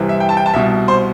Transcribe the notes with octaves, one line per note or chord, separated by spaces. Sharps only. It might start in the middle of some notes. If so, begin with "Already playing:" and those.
Already playing: C2 C3 E3
E5
G5
A5
G5
A5
C2 B2 E5
C5